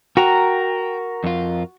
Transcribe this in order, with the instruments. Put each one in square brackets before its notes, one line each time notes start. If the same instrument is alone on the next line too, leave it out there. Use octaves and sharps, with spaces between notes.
[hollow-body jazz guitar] F#4 [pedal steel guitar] A#4 A#5 [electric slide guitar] G5
[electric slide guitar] F2 F4